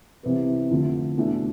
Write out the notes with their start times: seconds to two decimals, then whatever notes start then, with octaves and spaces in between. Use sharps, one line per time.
0.23 C2 C3 E3 B3
0.71 F2 D3 A3
1.17 E2 B2 A3 D4